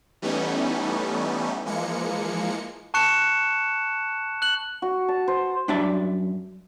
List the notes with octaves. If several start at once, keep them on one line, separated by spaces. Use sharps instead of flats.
E3 G3 A3 B3 C#4 D#4
E3 F3 G#3 A#3 C#7
A5 C#6 F#6 C#7 E7
F#6 F#7
F#4
A5
C5
F#2 G3 D4 D5 E5 A5